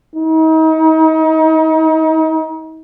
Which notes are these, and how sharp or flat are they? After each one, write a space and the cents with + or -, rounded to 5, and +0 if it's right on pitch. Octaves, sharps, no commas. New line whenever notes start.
D#4 +35